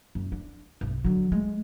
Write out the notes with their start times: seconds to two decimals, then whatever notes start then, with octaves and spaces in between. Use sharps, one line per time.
0.15 F#2
0.32 D4
0.81 B1 G2
1.05 D3 F#3
1.32 G#3 A3